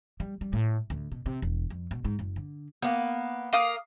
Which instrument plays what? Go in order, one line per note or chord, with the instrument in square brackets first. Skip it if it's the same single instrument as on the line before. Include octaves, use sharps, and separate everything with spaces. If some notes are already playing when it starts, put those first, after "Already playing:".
[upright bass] G3
G3
A2
D2
B2
C3
E1
F2
B2
G#2
F#1
D3
[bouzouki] A#3 B3
[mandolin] A#3 F5 D#6